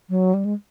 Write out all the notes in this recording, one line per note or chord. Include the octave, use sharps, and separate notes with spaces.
F#3
G3
G#3